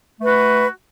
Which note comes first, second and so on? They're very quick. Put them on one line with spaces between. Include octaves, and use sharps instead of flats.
A3 B4 F#4